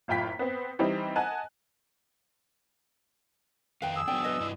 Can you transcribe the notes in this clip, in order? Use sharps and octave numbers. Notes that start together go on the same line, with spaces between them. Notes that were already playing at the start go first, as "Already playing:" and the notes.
F#1 A2 F4 G5 B6
B3 C4
E3 G3 C4 D#4
D#5 F#5 G#5 A5 F#6
F2 D#3 B4 F5 G5
G#4 E6
F#3 B3 D4 G5
B4 D#5
G2 E4 D5